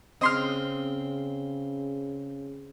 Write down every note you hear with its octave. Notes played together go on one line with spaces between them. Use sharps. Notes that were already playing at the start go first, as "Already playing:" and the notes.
C#3 C4 D#5 C6 F6